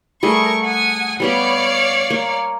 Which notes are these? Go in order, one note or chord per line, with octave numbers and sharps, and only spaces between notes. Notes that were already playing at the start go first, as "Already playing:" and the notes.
G3 A3 G#4 A#4 C#6
F#5 G#5 D#6
G3 B3 G4 C#5 D5 F5
A#3